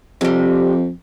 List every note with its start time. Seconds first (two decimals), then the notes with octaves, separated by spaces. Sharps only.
0.21 F2 C3 G3